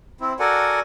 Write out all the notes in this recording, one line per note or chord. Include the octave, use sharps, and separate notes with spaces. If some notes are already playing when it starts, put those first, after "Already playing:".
C4 E4
F#4 A4 A#4 D5 F#5 G#5